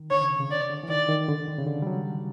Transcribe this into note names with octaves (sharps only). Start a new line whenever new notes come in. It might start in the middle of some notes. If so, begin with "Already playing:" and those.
Already playing: D#3
D3 C#5
C#3
C3
C#3
D3 D5
D3
E3
D#3 D5
D#3
D3
D#3
C#3
D3
G3
F#3